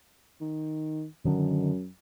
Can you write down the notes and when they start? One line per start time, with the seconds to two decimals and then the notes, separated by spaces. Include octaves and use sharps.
0.41 D#3
1.25 F#2 D3 D#3